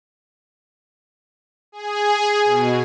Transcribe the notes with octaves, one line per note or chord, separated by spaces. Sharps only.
G#4
B2